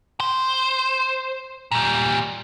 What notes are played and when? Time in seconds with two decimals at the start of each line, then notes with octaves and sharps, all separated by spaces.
0.20 C5
1.72 A#2 G3